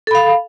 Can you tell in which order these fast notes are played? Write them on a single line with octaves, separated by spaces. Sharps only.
A4 B5 F5